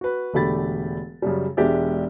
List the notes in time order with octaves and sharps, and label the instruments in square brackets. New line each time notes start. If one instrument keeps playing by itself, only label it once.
[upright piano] F#4 B4
E1 D3 A3 G4 B5 A6
F#2 C#3 G3
E1 G#3 D4 G4 D5 E5